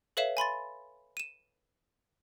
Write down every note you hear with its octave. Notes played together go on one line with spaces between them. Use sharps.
A4 B4 C#5 E5 F5 E7
G#5 B5 C6 A6
D#7 E7